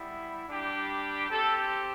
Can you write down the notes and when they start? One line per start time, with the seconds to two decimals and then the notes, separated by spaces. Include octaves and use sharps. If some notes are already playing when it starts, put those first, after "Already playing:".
Already playing: G3 B3 E4
0.46 G3 D4 G4
1.29 C4 G4 A4